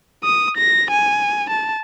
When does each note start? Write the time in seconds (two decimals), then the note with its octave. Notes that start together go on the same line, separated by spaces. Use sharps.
0.24 D#6
0.57 A#6
0.91 G#5
1.50 A5